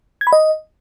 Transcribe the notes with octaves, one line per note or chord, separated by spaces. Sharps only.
G#6
B5
D#5